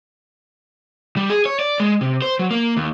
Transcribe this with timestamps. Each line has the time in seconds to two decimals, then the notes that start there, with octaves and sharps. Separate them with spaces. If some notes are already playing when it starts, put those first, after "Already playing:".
1.16 G3
1.30 G#4
1.46 C#5
1.60 D5
1.80 G#3
2.01 C3
2.22 C5
2.39 F#3
2.51 A#3
2.77 D#2